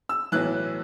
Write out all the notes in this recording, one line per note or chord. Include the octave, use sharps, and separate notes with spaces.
E6
B1 A2 E3 F#6